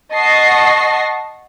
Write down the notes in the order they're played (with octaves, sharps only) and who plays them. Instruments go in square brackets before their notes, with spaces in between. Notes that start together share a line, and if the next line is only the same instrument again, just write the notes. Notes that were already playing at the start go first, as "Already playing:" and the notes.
[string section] D#5 F#5 A5 C#6 A#6 C7